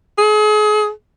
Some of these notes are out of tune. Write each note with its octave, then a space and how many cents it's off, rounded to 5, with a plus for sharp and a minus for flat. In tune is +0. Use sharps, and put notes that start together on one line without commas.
G#4 +35